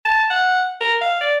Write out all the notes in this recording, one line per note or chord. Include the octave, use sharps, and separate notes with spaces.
A5
F#5
A#4
F5
D5